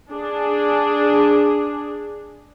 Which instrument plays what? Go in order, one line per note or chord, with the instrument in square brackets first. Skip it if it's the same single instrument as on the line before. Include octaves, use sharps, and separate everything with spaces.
[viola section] D4 G#4